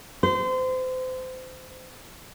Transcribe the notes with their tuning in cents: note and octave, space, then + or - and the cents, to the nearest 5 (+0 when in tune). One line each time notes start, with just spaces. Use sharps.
C5 -30